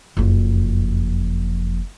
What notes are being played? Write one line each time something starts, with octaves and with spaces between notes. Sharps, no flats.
F#1 F2